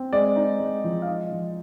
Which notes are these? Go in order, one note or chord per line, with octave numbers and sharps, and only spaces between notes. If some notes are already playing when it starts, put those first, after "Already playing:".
Already playing: C4
G#3 D5
D#4
G#3
F3
F5
D#4 D#5
F3